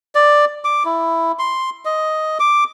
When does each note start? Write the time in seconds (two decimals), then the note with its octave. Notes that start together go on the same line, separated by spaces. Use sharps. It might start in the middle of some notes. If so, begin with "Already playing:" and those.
0.15 D5
0.65 D6
0.85 E4
1.39 C6
1.85 D#5
2.40 D6